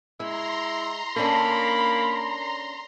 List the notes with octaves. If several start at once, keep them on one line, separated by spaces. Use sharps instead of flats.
G#3 E4 A#5 C6
A#3 C#4 D4 A4 B5